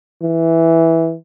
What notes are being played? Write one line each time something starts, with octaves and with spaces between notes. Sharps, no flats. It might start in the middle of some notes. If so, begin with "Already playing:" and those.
E3